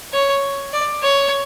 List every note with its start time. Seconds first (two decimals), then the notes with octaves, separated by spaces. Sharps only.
0.13 C#5
0.73 D5
1.03 C#5